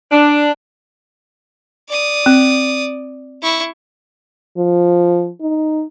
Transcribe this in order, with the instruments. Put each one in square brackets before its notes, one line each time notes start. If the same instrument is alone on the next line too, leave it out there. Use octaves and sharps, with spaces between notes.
[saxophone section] D4
[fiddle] D5 D#6
[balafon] C4
[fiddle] E4 C#6
[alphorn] F3
D#4